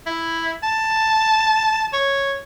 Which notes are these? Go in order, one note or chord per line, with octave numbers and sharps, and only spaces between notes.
E4
A5
C#5